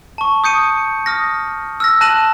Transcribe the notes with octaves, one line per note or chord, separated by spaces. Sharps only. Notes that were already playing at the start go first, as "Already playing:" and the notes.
A5 C#6
D#6 G6 C#7 D#7
D#6 F6 A#6
E6 F6 A#6
A5 F#6 A#6 D#7 E7 F#7